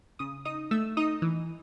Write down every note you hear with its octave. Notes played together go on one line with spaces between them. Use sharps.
C#3 D#6
D#4 D#6
A3 E6
D#4 D#6
E3